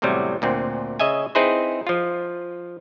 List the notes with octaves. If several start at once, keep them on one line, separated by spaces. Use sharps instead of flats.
E2 A2 C3 F#3 G3
D2 A#2 C4
C#3 D#5 E5 G#5
C4 D#4 E4 G#4 B4 C5
F3 F4